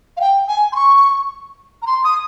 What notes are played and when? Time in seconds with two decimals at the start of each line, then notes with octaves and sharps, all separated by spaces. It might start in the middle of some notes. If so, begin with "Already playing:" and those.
0.17 F5
0.21 G5
0.48 G#5
0.72 C6
0.76 C#6
1.82 A#5
1.87 C6
2.04 D#6